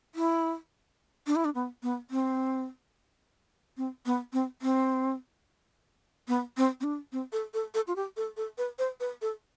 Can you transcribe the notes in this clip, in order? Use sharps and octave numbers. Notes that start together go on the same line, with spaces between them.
E4
D4
E4
D4
B3
B3
C4
C4
B3
C4
C4
B3
C4
C4
D4
C4
A4
A4
A4
F4
G4
A4
A4
B4
C5
B4
A4